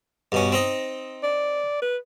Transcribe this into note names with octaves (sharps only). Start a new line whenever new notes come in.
G2 B2 C#4
C4 D#4 D#5
D5
B4